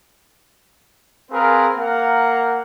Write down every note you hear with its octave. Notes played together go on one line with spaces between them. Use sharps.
C4 G#4 A#4 B4 F5
A#3 A#4 F5 F#5